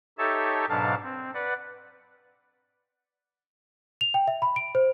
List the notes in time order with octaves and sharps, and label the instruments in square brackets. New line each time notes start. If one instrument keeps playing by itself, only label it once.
[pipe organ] D#4 G4 A4 C#5 E5 A5
G#2 B2 F#3 D4 F5 A5
C4
B4 D5 F#5
[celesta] F7
G5
E5
B5
D7
C5